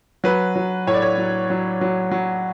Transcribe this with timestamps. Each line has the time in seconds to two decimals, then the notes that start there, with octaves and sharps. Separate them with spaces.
0.24 F#3 B4
0.56 F#3
0.87 A2 C#5
0.94 D5
1.02 C#5
1.18 F#3
1.50 F#3
1.81 F#3
2.11 F#3